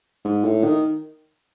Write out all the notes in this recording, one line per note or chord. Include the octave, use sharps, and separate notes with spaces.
G#2
A2
D#3